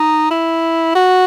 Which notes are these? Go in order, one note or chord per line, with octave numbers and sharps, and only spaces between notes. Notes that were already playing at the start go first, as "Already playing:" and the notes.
Already playing: D#4
E4
F#4